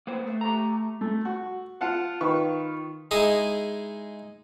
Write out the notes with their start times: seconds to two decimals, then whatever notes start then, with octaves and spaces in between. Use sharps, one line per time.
0.07 A#3 B3 C5
0.24 A3
0.41 G4 A#5
1.01 A3
1.25 F#4
1.81 F4 F5 F#5 A5
2.21 D#3 F4 B4 C#6
3.11 G#3 D#4 E4 G#4